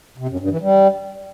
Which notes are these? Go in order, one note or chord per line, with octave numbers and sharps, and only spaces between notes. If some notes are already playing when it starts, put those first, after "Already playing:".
C3
F#2
G2
E3
G3